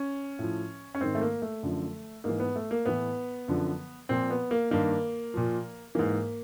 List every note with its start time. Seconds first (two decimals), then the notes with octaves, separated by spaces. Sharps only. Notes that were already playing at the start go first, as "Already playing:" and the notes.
Already playing: C#4
0.39 A2 F3
0.95 C#4
1.00 G#2 D#3 C4
1.15 A3
1.21 A#3
1.42 A3
1.63 F#2 D3 F3
2.24 G#2 E3 A#3
2.40 B3
2.56 A3
2.71 A#3
2.85 A2 E3 B3
3.48 F#2 D3 F3
4.09 A#2 F3 C4
4.30 B3
4.51 A#3
4.71 G2 D#3 A#3
5.34 A#2 F3
5.95 G#2 E3 A#3